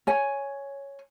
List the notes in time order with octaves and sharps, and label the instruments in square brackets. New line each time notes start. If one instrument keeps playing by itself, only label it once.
[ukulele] C#5 G#5